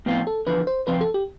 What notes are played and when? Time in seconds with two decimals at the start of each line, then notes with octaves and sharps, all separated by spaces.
0.06 A2 F3 B3 C4 F4
0.27 A4
0.46 E2 D3 F3 B4
0.67 C5
0.87 F2 C3 F3 C4 F4 B4
1.01 A4
1.14 G4